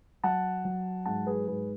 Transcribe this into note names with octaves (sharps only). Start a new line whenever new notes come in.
F#3 F#5 A5
F#3
G#2 F#5 A5
G#4 B4
G#2 G#4 B4